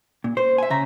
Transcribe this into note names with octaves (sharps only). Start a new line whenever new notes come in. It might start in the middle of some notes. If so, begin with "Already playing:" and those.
A#2
C5
E5 G#5
C#3 E5 A#5